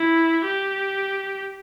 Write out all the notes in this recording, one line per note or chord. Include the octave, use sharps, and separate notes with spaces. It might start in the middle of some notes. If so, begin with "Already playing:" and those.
Already playing: E4
G4